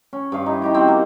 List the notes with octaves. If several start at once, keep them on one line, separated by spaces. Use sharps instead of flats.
C#4
G2 F5
D#4 E4
D#4 G4 G5
C4 F#4
A#3